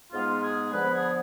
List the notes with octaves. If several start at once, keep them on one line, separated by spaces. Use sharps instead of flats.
G#2 G#3 B3 F4
F4
G#4
D3 F3 B3 D4 B4
G#4